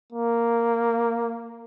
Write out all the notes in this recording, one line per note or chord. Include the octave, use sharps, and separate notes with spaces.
A#3